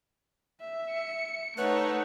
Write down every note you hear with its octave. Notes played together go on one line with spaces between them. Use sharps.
E5
C#7
A3 D#4 B4 C#5 F#5